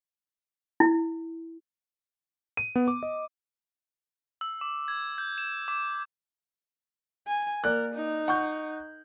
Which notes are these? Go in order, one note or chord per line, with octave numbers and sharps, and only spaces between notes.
E4
D#7
B3
D6
D#5
E6
D6
G#6
G6
E7
D6
G#5
A#3 A#4 D5 F#6
D#4
F#5 C#6 G6